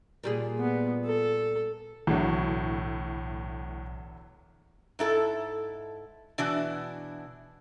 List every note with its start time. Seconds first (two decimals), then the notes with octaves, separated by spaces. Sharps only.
0.23 A#2 G3 G#4
0.60 B3
1.06 A4
2.07 B1 E2 A2 D3 F#3
4.99 G#2 E4 A4
6.38 B2 E3 D4 E4 F#4